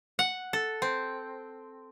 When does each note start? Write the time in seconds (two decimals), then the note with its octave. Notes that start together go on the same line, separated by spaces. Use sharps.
0.19 F#5
0.53 A4
0.82 C4